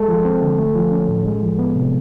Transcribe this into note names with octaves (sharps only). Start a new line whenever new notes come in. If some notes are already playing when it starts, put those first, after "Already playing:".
Already playing: G#3 A4
F3
C4
D3
A3
F3
C#4
A2
G#3
F3
B3
C3